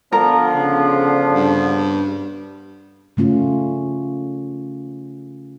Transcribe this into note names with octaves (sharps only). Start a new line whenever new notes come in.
D3 F3 B3 A#4
C#3
G2
C#3 A3 C#4 F4